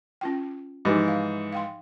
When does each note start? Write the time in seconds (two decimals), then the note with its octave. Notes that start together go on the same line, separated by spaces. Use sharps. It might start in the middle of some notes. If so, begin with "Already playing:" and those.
0.21 C#4 F4 G5
0.85 G#2 E3 F3 D#4 G4
1.08 F5
1.53 F5 G5 C6